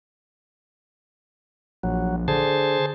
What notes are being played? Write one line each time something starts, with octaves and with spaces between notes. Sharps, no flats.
A#1 F#3
D3 G#4 C5 A5